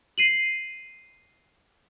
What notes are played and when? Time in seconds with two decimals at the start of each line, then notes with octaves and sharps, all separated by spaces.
0.18 C7 D#7 F#7